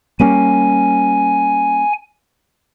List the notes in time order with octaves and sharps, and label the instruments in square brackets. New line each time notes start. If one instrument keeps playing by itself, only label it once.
[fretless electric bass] G3 A#3 C#4 [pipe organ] G#5